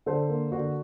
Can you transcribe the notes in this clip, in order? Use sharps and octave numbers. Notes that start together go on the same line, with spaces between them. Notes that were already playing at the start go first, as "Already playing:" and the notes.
D3 A4 C5
A#3
D3 F#4